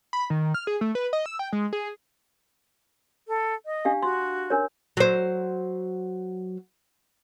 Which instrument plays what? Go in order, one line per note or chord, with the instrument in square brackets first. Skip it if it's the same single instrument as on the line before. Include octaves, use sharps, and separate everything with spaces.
[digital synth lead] B5
D#3
F6
G#4
A3
B4
D#5
E6
G5
G#3
G#4
[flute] A4
D#5
[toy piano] D4 G4 F5
[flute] F#4 [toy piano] C6
[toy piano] D4 A#4 C#5
[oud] F#3 C5